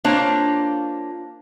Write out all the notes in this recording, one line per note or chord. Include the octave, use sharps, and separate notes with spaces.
A#3 D4 F4 C5 C#5